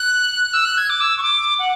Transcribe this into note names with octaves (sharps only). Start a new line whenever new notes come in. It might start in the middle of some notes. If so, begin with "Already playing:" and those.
Already playing: F#6
E6
F#6
G#6
D6
E6
C#6
D6
F#5